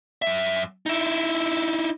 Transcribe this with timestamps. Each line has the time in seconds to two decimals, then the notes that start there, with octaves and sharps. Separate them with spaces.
0.22 F#2 E5
0.86 D#4 E4